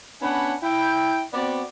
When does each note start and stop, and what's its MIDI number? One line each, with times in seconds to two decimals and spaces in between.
0.22 0.54 59
0.22 0.54 61
0.22 0.54 62
0.22 0.54 78
0.22 0.54 80
0.22 0.54 83
0.63 1.23 64
0.63 1.23 79
1.33 1.62 59
1.33 1.62 60
1.33 1.62 66
1.33 1.62 74